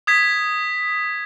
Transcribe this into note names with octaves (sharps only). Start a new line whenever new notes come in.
D#6 G#6 B6